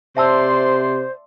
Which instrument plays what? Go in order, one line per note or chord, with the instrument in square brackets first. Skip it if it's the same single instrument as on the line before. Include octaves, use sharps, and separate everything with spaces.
[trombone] C3 [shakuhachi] C5 [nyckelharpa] D5 C6 [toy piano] E5 A5 E6